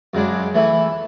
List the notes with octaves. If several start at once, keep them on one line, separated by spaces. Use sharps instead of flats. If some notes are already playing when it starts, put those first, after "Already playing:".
F#2 C#3 G#3 D4
E3 A3 E4